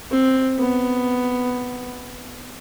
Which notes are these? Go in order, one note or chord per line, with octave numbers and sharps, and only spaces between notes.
C4
B3